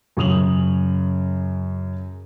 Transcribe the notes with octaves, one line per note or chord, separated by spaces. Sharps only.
F#2 C#3 D#6 F7 F#7